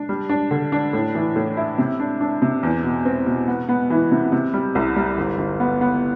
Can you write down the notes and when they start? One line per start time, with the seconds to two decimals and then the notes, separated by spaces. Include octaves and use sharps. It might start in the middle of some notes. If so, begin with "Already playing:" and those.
Already playing: D4
0.09 G3
0.29 D4
0.51 D3
0.72 D4
0.93 A2
1.15 E3
1.36 A2
1.57 E4
1.78 C3
1.99 D4
2.21 D4
2.42 C3
2.63 E2
2.84 B2
3.05 C4
3.26 B2
3.48 B3
3.69 B3
3.90 E3
4.12 C3
4.32 C3
4.54 G3
4.75 C2
4.96 G3
5.18 G1
5.38 G1
5.60 B3
5.81 B3